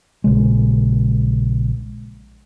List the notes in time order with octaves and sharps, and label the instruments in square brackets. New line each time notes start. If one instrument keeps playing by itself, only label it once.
[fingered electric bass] A#1 C#3 G#3